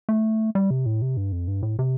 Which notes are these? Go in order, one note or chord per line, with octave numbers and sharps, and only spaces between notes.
A3
G3
C3
A2
C3
G2
F2
G2
A2
C3